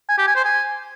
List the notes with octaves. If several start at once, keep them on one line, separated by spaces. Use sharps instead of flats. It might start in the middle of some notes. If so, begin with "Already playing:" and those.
G#5
G4
G#5
C5
G#5